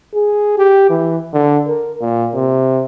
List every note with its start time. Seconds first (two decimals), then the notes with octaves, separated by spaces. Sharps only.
0.14 G#4
0.58 G4
0.90 E3
1.33 D3
1.67 A#4
2.01 A#2
2.35 C3